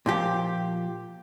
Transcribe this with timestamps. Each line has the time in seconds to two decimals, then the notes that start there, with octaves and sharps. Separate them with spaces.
0.06 A#2 F3 G4